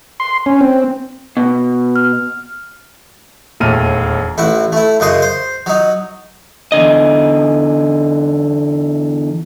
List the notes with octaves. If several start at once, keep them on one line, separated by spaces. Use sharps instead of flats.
C6
C#4
C4
B2
F6
E1 D#2 A#2 A3 F6 D#7
A1 E4 F#4
A3 E4
F#2 C#3 D#5 C6
C5
F#3 D#4
E2 G2 D3 D#5